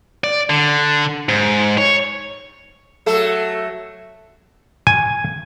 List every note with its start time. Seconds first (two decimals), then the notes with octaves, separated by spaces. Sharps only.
0.24 D5
0.50 D3
1.29 G#2
1.78 C#5
3.06 F#3 A3 A4
4.87 G#5